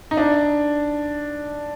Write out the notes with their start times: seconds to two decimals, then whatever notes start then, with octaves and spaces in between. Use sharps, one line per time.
0.11 D#4
0.17 D4